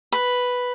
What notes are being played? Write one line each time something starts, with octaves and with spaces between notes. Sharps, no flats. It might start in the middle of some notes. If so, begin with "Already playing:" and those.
B4